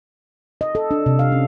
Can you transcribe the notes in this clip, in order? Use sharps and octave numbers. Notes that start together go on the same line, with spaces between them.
D#5
A4
D4
C3
F5
C#4